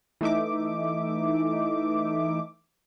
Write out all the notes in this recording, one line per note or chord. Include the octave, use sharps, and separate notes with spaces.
E3 A3 D#4 E5 D6